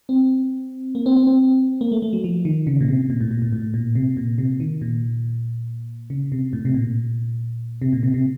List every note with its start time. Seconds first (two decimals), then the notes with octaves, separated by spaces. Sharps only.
0.09 C4
0.95 A#3
1.06 C4
1.16 C4
1.27 C4
1.81 A#3
1.92 A3
2.02 A3
2.13 F#3
2.24 F3
2.45 D#3
2.67 C#3
2.81 A#2
2.88 C3
3.10 A#2
3.21 A2
3.31 A#2
3.42 A2
3.53 A2
3.74 A#2
3.95 C3
4.17 A#2
4.38 C3
4.60 D#3
4.81 A#2
6.10 C#3
6.32 C3
6.53 A2
6.65 C3
6.74 A#2
7.82 C3
7.93 A#2
8.03 C3
8.14 C3